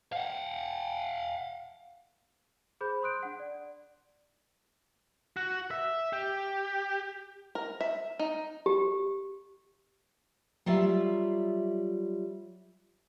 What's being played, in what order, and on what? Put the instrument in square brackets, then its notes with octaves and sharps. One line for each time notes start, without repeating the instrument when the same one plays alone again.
[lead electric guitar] F5 F#5
[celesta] G#4 C5 B5 G6
C6 D#6 F#6 D7
D4 F#5
D5
[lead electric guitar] F#4
E5
G4
[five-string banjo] A#4
E5
D#4
[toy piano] G4
[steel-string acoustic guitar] F#3 G3 F4 E5